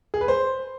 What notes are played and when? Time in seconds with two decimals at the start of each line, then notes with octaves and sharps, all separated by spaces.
0.14 G#4
0.21 B4
0.28 C5